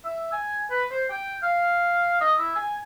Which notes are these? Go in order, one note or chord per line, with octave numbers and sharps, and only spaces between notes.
E5
G#5
B4
C5
G5
F5
D#5
E4
G#5